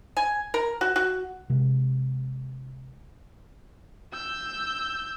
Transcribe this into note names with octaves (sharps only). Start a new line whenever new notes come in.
G#5
A#4
F#4
F#4
C3 G#3
E6 G6